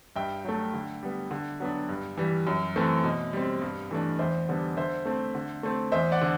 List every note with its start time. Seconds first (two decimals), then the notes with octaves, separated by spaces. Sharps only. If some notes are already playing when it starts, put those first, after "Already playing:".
0.16 G2 E5 G5
0.45 F#3 A3
0.74 D3
1.03 G3 B3
1.31 D3
1.60 F#3 B3 D4
1.89 G2
2.17 E3 G3
2.47 F#2
2.76 E3 A3 C4
3.04 B2
3.33 G3 C4
3.62 G2
3.91 E3 A3 D4
4.19 E2 C5 E5
4.49 D3 G3 B3 D4
4.77 D3 C5 E5
5.05 A3 C4
5.35 D3
5.63 A3 C4
5.92 E2 C5 E5
6.12 D5 F#5
6.21 D3